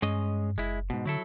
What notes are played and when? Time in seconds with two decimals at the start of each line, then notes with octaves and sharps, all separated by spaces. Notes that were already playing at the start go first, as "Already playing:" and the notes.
0.02 G2 G#3 C#4 D#5
0.58 F#1 G#3 E4
0.90 G#2 B2
1.06 D3 F#3 E4 A4